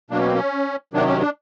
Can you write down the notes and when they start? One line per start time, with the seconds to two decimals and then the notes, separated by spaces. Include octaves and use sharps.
0.10 B2 F#3 A#3 D4
0.19 C#4
0.26 C4
0.35 C#4
0.94 C3 D#3 F#3 D4
1.08 C#4
1.20 D4